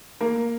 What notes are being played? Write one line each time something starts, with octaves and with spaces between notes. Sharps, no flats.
A#3 A#4